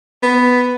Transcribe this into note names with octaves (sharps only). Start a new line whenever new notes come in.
B3